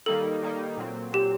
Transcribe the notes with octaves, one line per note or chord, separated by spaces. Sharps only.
D#3 G3 A#3 D#4 A4
D#3 G3 A#3 D#4
A#2 F#3 C4
A#2 F#3 C4 G4